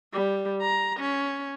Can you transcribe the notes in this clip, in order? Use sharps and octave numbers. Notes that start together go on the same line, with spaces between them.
G3
A#5
C#4